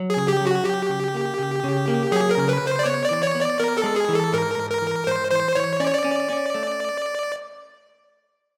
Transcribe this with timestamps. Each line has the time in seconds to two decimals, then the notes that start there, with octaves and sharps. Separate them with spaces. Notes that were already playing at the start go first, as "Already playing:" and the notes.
Already playing: F#3
0.10 G#4
0.16 C#3
0.28 G4
0.41 F#3
0.47 F#4
0.65 F#3 G4
0.89 C#3
1.14 A#3
1.39 C#3
1.64 C#3
1.88 A#3
2.12 F#3 G#4
2.31 A#4
2.37 C#3
2.49 B4
2.61 C#3
2.67 C5
2.79 D5
2.86 B3 C#5
3.05 D5
3.11 E3
3.23 C#5
3.35 B3
3.41 D5
3.60 B3 A#4
3.78 A4
3.84 G#3
3.96 G#4
4.09 E3
4.15 A4
4.33 G#2 A#4
4.57 G#2
4.70 A#4
4.82 E3
5.07 G#2 C5
5.31 E3 C5
5.55 E3 C#5
5.80 C#4 D5
5.87 C#5
5.94 D5
6.04 C#4
6.30 C#4
6.55 A3